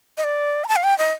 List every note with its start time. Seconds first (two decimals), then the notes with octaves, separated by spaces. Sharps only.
0.17 D#5
0.24 D5
0.64 A#5
0.68 A5
0.76 F5
0.83 G5
0.98 D#5